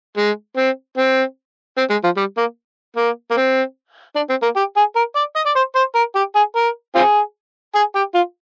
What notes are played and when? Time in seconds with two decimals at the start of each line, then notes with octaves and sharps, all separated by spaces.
0.17 G#3
0.57 C4
0.97 C4
1.77 C4
1.90 G#3
2.04 F3
2.17 G3
2.37 A#3
2.96 A#3
3.31 A#3
3.37 C4
4.16 D4
4.30 C4
4.42 A#3
4.56 G4
4.77 G#4
4.96 A#4
5.16 D5
5.36 D#5
5.46 D5
5.56 C5
5.75 C5
5.95 A#4
6.15 G4
6.35 G#4
6.56 A#4
6.95 C4 F4 G#4
7.75 G#4
7.95 G4
8.15 F4